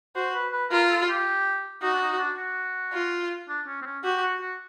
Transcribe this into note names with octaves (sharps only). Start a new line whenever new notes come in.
F#4 C5
B4
B4
F4 A#4
A4
G4
D#4 F#4
D4
D#4
D4
F#4
F4
D4
C#4
C4
C#4
F#4 G4
G4
F#4
F#4